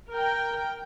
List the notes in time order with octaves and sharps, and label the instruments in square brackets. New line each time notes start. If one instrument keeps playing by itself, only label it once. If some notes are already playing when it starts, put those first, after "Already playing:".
[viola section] A#4 G5